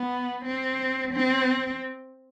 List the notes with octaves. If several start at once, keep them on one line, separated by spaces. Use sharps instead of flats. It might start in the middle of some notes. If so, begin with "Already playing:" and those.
Already playing: B3
C4
C4